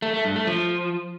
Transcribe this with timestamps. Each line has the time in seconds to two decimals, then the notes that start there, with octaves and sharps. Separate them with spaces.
0.02 A3
0.14 A3
0.25 G2
0.36 A3
0.47 F3